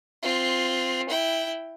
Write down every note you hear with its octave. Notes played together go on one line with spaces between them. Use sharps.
C4 F4
E4 G5